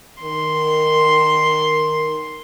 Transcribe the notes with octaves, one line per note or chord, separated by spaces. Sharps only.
D#3 A#4 C6